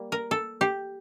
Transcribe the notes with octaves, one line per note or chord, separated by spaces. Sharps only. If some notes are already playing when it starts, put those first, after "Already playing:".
Already playing: G3 A#3
A#4
A4
G4